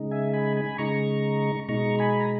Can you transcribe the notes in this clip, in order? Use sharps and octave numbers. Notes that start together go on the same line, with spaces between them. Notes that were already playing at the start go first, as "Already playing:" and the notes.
Already playing: C#3 G#3 D#4
E5 G#5
G#5 B5
G#5 B5
C#3 G#3 D#4 A#5 C#6
B2 G#3 D#4 A#5 C#6
G#5 B5
A#5